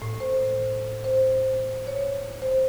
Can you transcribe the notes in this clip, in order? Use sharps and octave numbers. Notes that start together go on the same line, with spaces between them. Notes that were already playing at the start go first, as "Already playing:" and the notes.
A2
C5
C5
C#5
C5